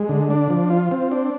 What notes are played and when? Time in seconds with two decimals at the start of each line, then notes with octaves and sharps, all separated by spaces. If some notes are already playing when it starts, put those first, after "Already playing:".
Already playing: G#3
0.09 D3
0.30 D4
0.50 F3
0.70 F4
0.91 C4
1.12 D4